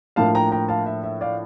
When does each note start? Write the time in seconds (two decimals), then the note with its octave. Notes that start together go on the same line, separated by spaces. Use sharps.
0.16 A2 F3 A#3 D4 F5 A5
0.35 G5 A#5
0.52 G5 A#5
0.69 F5 A5
0.86 E5
1.03 E5
1.21 D5 F5